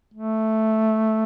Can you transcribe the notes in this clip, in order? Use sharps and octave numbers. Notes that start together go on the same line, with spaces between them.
A3